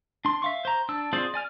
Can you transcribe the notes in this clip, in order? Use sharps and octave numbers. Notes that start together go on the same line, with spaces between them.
D4 C6
E5 F5 C#6
C5 A#5
D4 A5 E6
C4 F4 G#4 C5 D5
D5 G#5 F6